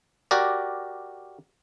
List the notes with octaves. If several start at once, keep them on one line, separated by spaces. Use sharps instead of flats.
F#4 G4 A#4 D5